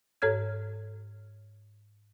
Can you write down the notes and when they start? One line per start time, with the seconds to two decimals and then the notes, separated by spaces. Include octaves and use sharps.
0.22 G#2 A4 C#5 F6 G#6